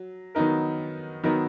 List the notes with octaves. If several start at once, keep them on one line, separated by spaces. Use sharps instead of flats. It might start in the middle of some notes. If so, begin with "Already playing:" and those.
Already playing: F#3
D#3 F#3 B3 D#4 A#4
D#3 F#3 B3 D#4 A#4